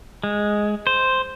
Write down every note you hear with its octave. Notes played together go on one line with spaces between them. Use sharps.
G#3
C5